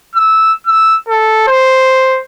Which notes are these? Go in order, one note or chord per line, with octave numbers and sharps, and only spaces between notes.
E6
E6
A4
C5